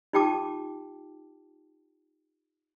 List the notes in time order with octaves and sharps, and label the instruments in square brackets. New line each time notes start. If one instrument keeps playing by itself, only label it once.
[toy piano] D#4 F4 G4 G5 A5 D6